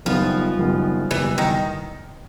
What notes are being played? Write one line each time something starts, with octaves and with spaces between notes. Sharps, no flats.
F#1 F#2 D#3 F3 G3 B3
F#1 F#2 D#3 G3 B3
F#1 E2 B2 E3 G3
D#3